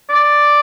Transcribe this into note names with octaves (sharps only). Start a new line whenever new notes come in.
D5